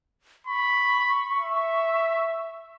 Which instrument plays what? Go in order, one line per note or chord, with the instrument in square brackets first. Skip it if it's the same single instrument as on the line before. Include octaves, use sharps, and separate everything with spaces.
[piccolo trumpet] B5 [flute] C#6
[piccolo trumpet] E5